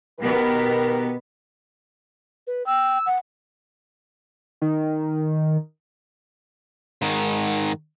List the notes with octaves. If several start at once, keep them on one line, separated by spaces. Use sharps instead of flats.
B2 D#3 B3 G4 A#4
B4
G5 E6
F#5
D#3
G#2 D#3